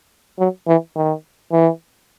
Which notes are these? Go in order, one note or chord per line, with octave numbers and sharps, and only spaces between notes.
F#3
E3
D#3
E3